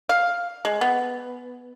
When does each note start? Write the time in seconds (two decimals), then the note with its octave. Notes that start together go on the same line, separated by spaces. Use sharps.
0.09 F5
0.65 G#3
0.81 B3